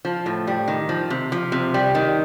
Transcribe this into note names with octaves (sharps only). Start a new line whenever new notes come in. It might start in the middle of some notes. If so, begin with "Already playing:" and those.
F3
A2
G3
D#3
F3
C3
F3
C3
G3
D#3